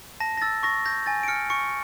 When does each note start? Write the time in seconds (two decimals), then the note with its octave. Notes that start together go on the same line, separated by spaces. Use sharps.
0.20 A5 A#6
0.37 A#6
0.42 E6 A6
0.63 C#6 A#6
0.86 G6 A#6
1.06 G#5 A6
1.23 D7
1.28 F6 C#7
1.50 C#6 C#7